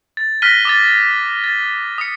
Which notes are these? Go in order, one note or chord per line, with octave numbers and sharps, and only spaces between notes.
A6
F6 F#6 A#6 B6 D#7 G7
D6 D#6 A6
A6
D#6 C#7